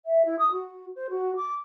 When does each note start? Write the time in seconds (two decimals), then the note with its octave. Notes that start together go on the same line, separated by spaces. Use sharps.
0.05 E5
0.25 E4
0.38 D#6
0.51 F#4
0.95 C5
1.09 F#4
1.35 D6